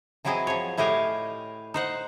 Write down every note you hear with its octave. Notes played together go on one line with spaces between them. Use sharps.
E3 F#3 C4 E4 G#4 D#5
F3 C#5
A2 E4 G4 D#5 F5 G#5
D#4 C5 F#5